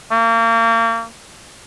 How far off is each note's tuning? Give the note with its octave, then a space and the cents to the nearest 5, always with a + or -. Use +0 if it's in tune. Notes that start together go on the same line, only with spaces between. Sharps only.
A#3 -35